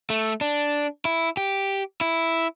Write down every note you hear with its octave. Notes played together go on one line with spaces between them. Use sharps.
A3
D4
E4
G4
E4